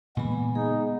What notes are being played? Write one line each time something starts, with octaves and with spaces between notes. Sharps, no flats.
A#2 C#3 E3 G#3 B3 G#5 B5
D#4 G#4